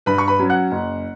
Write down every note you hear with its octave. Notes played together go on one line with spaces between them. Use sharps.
G2 B4 B5
C#6
B4 B5
F#3 C#4
F#5 F#6
F#1